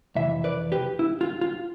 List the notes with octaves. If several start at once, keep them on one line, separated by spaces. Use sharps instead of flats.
F2 C3 E3 E5
B4 D5
G4 B4
E4
F4
F4